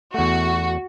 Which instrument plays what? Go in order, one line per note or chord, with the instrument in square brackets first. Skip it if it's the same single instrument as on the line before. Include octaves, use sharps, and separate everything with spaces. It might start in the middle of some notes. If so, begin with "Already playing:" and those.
[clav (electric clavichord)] E2 A3 [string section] F#4